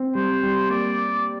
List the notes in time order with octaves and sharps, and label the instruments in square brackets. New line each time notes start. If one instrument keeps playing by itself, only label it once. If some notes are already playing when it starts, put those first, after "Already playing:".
Already playing: [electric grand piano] C4
[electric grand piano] G3 [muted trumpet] C5
[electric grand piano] G3
[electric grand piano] A#3 [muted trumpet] D5